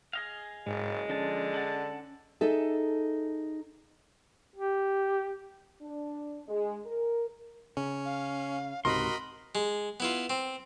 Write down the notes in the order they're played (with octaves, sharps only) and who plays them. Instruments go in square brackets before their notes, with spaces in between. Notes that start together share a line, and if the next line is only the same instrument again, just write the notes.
[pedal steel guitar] G#4 D#5 F5
[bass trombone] F#1 [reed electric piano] G#2 [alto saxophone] G#3
[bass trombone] D3 [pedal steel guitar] F3 D4 A5 [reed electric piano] C#4
[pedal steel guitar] D4 F#5 A5
[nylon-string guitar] D#4 G#4 A4 E5
[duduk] G4
[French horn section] D4
G#3
A#4
[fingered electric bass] C#3 [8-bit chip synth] C#4
[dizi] F5
[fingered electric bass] C#2 G#2 C3 [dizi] F#4 [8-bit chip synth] A#4 D#5 B5 [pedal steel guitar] C6
[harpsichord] G#3
B3 E4 F4
C4